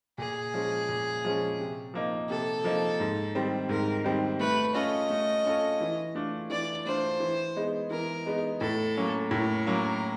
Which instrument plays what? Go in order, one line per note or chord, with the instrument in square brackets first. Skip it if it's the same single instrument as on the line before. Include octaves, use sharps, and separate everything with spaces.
[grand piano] A#2 [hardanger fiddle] G#4
[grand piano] F3 G#3 C#4
A#2
F3 G#3 C#4
C3
F3 A#3 D#4
[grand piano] C3 [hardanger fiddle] A4
[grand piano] F3 A#3 D#4
G#2
D#3 G3 C4
[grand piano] G#2 [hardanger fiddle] A#4
[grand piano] D#3 G3 C4
[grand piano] A3 [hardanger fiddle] B4
[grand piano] C#4 F4 A4 [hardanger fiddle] D#5
[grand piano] A3
C#4 F4 A4
E3
A3 D4 F4
[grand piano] E3 [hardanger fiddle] D5
[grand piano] A3 D4 F4 [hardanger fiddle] C5
[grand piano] E3
G#3 B3 D#4
[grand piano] E3 [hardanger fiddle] A#4
[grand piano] G#3 B3 D#4
[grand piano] A2 [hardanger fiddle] A4
[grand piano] F#3 A#3 C#4
[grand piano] A2 [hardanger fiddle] A#4
[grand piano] F#3 A#3 C#4